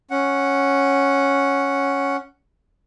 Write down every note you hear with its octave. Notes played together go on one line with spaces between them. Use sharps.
C#4 F#5